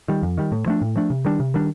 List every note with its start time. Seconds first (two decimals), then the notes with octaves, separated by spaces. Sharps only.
0.08 D#3 G3
0.23 F2
0.38 D#3 G3
0.52 A2
0.66 F3 A3 D4
0.81 A2
0.96 F3 A3 D4
1.10 C3
1.25 D#3 G3 D4
1.40 C3
1.54 D#3 G3 D4